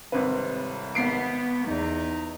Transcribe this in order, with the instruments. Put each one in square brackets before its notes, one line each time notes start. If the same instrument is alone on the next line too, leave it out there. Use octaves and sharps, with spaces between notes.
[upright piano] G#1 C4 B4 [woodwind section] A2 C3 G3
[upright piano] G#1 C7 D7 [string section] B3
[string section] E2 [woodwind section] D#4